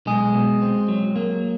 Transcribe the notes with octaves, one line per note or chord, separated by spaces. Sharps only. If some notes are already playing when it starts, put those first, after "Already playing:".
B1 G#3 G#4
B2
C4
F#3
A#3